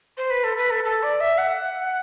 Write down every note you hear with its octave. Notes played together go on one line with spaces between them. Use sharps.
C5
B4
A4
B4
A4
A4
D5
E5
F#5